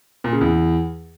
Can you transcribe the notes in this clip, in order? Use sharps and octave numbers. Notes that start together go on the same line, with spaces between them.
A#2
C#3
E2